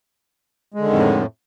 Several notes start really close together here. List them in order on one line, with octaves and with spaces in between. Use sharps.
G#3 D3 D#3 F2 A2